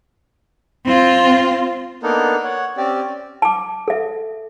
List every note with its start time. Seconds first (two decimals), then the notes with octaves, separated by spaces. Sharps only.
0.85 C4 F4
2.03 A#3 B3 D4 D#4 A4 A#4
2.44 C#5 F#5
2.77 C4 C#4 G4 D5
3.42 A5 D6
3.88 A4 E5